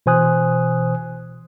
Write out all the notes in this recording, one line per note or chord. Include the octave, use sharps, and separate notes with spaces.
B2 E3 C5 G#5 D#6 F#6